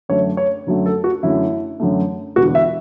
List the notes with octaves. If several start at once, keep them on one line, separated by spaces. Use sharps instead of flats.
F#2 D3 F#3 A3 C#5
C#5
F#2 D3 F#3 A3
A4
F#4
F#2 D3 F#3 A3 E4
F#2 D3 F#3 A3
E1 E2 D3 F#4
E5